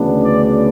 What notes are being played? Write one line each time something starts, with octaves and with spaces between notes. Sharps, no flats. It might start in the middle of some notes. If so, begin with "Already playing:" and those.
Already playing: D2 C#3 E3 B3 D4
D5